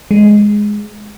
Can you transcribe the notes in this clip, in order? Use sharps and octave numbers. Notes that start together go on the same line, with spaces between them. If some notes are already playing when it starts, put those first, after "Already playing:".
G#3